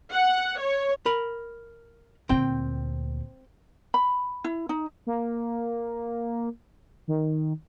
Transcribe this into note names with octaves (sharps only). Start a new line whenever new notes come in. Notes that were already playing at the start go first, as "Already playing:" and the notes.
F#5
C#5
A#4 B5
D2 A#2 C4 G5
B5
E4
D#4
A#3
D#3